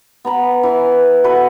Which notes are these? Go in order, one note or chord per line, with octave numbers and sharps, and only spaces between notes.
B3 A#5 B5
E3 G#5
F#4 A4 B4 E5